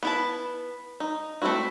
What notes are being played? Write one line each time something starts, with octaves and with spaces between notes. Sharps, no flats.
B3 E4 A5
D#4
A3 C4 C#4 E4 F#4